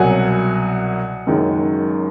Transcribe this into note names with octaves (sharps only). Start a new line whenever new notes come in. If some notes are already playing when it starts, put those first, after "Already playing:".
Already playing: C2 B2 F#3 F#5 G#5
F#1 F#2 D#3 G#3